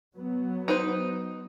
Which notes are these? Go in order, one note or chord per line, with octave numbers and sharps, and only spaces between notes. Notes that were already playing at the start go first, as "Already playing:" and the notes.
F#3 B3
D#4 B4 C5